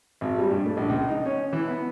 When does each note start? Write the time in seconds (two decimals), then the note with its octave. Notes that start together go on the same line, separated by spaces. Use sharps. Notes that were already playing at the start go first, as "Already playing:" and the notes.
0.21 G#1
0.38 G3
0.51 G2
0.66 A3
0.77 A#1
0.89 C#2
1.08 D#4
1.26 C#4
1.53 E3
1.68 B3